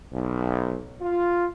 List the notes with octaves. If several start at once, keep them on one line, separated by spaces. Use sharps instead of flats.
B1
F4